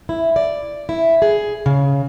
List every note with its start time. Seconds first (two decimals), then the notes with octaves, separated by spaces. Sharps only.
0.09 E4
0.36 D5
0.89 E4
1.22 G#4
1.66 C#3